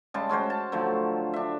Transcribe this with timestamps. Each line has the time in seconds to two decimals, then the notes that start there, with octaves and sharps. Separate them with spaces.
0.14 C#3 G3 G#3 A5
0.29 G#3 C#4 F#4 C5
0.50 A5
0.72 D3 F3 F#3 A3
1.34 D4 E5